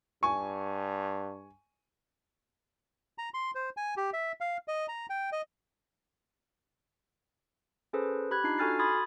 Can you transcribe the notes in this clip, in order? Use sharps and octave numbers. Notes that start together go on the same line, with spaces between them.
G2 G#5 C#6
A#5
C6
C5
G#5
G4
E5
F5
D#5
A#5
G5
D#5
C#4 G#4 A4 B4 C5
G4 B5 F#6 G#6
D4 D#4 F4 C7
F#4 A4 G#5 F6 A6 C7
B5 C6 D#6 G#6 A6